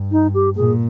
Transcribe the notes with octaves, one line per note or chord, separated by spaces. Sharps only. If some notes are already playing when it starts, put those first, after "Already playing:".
Already playing: G2
D#4
G4
A#2 G#4